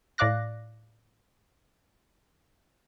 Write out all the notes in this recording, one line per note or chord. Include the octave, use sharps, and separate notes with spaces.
A2 D5 F5 D6 F#6 A#6